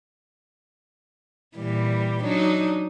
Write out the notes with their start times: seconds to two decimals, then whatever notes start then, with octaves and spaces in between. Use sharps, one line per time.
1.57 A#2 E3 G3
2.23 F#3 D4 D#4